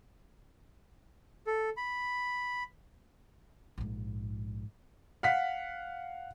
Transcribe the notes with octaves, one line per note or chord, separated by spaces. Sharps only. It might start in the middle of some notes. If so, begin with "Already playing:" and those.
A4
B5
A#1 G#2
F5 F#5 B6